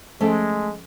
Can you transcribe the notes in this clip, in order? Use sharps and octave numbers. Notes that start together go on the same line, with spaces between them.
F3 G#3 A3 C#4 A4 G5